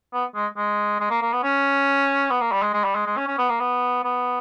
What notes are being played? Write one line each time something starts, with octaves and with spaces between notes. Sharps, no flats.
B3
G#3
G#3
G#3
A#3
A#3
B3
C#4
B3
A#3
G3
G#3
G#3
G3
G#3
G#3
C#4
C#4
B3
A#3
B3
B3